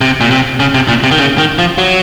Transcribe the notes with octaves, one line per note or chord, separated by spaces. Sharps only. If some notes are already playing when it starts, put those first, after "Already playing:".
C3
A#2
C3
C#3
C3
A#2
C3
D#3
C#3
D#3
F3
F#3